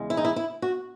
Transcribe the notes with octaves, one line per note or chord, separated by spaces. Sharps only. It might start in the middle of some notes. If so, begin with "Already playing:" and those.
Already playing: E2 C#3 G#3
E4
D#4
E4
E4
F#4